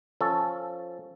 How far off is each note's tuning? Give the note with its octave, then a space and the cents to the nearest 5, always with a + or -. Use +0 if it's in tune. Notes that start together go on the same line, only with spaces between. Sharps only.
F3 +0 C#4 +0 A4 +0